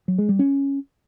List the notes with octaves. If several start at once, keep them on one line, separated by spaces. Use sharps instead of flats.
F#3
G#3
G3
C#4